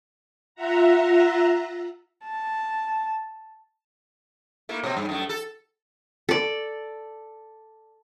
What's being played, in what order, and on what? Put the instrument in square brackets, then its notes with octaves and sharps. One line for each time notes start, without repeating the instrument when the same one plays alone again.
[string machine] F4 E5 F#5 A#5
[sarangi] A5
[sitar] A3 A#3 E4
B2 C4
G2
F#2 A3
A4
[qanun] A4 D5